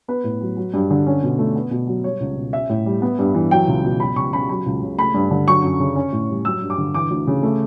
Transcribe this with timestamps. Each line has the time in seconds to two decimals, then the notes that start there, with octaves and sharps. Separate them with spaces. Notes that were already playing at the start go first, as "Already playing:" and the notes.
0.08 B3 B4
0.24 A2
0.41 F#3
0.57 F#3
0.73 G2
0.91 D3
1.07 C#4
1.23 B2
1.39 A3
1.56 B3
1.71 B2
1.87 F#3
2.04 G3 C#5
2.20 C#2
2.37 B2
2.53 C#4 E5
2.70 A2
2.86 G3
3.02 B3
3.18 G2
3.35 E3
3.51 F#3 G5
3.68 C#2
3.84 B2
4.00 F#3 B5
4.16 C#2 C#6
4.33 C#3 B5
4.49 F#3 B5
4.66 C#2
4.82 C#3
4.98 A3 B5
5.14 G2
5.31 D3
5.47 F#3 C#6
5.63 F#2
5.80 C#3
5.96 C#4
6.12 A2
6.29 G3
6.45 F#3 E6
6.61 G2
6.70 D6
6.78 D3
6.94 E3 D6
7.11 D2
7.27 C#3
7.43 A3